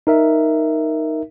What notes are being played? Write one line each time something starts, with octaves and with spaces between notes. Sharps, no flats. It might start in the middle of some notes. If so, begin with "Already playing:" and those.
D#4 A#4 E5